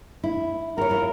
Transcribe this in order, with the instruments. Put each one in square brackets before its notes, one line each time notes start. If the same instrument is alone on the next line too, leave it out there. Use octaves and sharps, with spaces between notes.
[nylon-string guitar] E4
[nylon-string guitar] F#4 C#5 [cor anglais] A#4
[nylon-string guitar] E4 F4